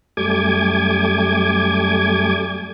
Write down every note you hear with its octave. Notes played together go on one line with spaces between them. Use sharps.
F#2 G3 A3 G#5 D6 G#6